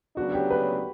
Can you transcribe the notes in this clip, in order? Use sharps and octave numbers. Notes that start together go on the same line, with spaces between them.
D2 C#3 F#3 B3 D4 F#4
G4
B4